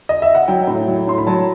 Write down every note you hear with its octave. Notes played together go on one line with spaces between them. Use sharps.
D#5
E5
F#5
F#3 G5
A2
F#3
A2 C6
B5
F#3 A5